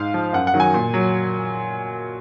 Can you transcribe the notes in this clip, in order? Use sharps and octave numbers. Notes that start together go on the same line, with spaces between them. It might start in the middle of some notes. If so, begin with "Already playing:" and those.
Already playing: G#2 F5
F3
F#2 F#5
F#5
D#3 F#3
G#5
A#2
F#3